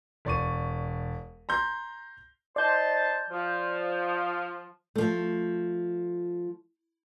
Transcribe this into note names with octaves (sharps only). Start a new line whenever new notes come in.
E1 D5 C#6 D#7
A#5 C6 G6
D#4 C5 D5 A5 G6
F3
F3 A3